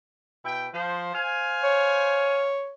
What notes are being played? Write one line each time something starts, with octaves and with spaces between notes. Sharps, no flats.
B2 E4 G5
F3 C5
C5 F5 G#5
C#5